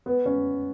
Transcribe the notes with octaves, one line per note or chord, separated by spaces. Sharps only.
B3
C#4